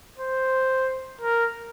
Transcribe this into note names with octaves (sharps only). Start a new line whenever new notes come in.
C5
A#4